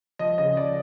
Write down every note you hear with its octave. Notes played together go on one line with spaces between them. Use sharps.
F3 D#5
C#3 D#5
F3 D5